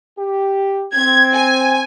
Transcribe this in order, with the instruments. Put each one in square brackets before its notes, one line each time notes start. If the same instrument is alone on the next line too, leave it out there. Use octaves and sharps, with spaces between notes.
[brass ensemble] G4
[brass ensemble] C4 [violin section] G#6
[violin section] G#5